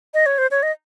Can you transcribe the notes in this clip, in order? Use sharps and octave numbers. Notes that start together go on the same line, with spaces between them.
D#5
C#5
C5
C#5
D#5